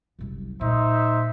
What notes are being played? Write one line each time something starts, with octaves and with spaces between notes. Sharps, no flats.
F#1 C2
A#2 D#4 C5 E5